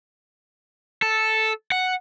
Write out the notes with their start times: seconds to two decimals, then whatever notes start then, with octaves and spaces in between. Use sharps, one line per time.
1.02 A4
1.72 F#5